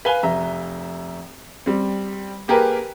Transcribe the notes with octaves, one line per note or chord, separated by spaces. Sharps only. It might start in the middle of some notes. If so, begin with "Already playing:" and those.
B4 F5 G#5 G7
F1 E5 A#5
G3 C4
A#3 G4 G#4 A#4 B4